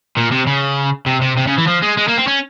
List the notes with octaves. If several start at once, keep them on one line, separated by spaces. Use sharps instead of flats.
A#2
C3
C#3
C3
C3
C3
C#3
E3
F3
G#3
G#3
A#3
C4
C#4